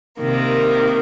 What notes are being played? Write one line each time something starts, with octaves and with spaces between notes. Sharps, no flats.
C3 D#3 A#3